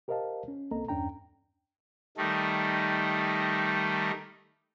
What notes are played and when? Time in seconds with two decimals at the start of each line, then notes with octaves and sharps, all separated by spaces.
0.08 G4 A#4 C5 D#5 F5 A5
0.48 C#4
0.71 C2 A#3 C4 A4 D#5 A#5
0.88 E2 G2 C#4 D4 G5 A#5
2.17 D#3 G3 A3 D#4